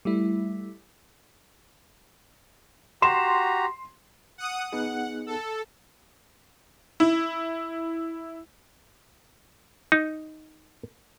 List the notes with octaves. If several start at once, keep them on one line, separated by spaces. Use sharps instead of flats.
G3 A3 E4
F#4 G4 A#5 C6 E7
F#5 D#6
B3 D#4 G#4 F#5
A4
E4
D#4